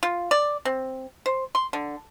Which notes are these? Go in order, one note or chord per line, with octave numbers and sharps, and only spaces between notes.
F4
D5
C4
C5
C6
D3